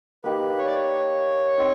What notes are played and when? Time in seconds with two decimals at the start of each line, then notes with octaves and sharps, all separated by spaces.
0.24 A#3 D#4 G4 B4
0.58 C#5
0.66 D5
0.75 C#5
1.58 C4 D#4